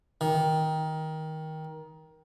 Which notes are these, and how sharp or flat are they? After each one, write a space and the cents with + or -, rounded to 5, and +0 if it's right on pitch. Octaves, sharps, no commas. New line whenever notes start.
D#3 +15